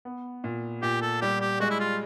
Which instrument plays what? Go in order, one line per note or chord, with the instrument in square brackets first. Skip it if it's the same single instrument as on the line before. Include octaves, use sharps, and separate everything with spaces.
[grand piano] B3
A#2
[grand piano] A#2 [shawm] G4
[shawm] A4
[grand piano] G3 [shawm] G4
[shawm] G4
[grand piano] G#3 [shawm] F#4
[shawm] E4
F4